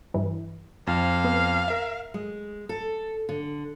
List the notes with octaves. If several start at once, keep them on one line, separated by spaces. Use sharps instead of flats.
G2 E3
F2 F5
B3
A#4 E5
G#3
A4
D3